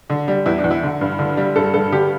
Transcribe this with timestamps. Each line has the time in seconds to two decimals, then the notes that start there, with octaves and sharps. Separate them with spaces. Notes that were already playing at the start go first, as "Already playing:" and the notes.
0.10 D3
0.28 G3
0.46 E2 E4
0.58 D4
0.64 E2
0.71 E4
0.83 D3
1.01 G2
1.19 D3
1.37 G3
1.56 G2 A4
1.74 G2 A4
1.92 D3 G4